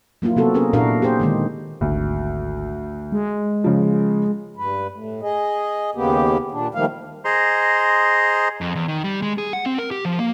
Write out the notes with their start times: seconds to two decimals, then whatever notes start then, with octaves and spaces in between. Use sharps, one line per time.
0.22 F#3 A#3 E4 F4
0.36 C3 F#3 B3 C4 F#4 A4
0.54 C#4 G#4 A#4
0.73 A#2 D4 E4 F#4 A#4 F5
1.02 G4 G#4 C5
1.20 D3 D#3 G#3
1.81 G#1 D2
3.12 G#3
3.64 C#3 F3
4.56 G2 B4
4.91 A2
5.22 G#4 D#5
5.95 D#2 C#3 A#3 B3 G4
6.51 A#2 D4
6.75 D#3 F3 G3 A3 A#3 F5
7.25 G#4 C5 D#5 A#5 C6
8.61 F2
8.75 E2
8.88 D#3
9.04 G3
9.22 G#3
9.38 G#4
9.53 F#5
9.66 C4
9.78 A#4
9.91 G4
10.05 F3
10.19 A#3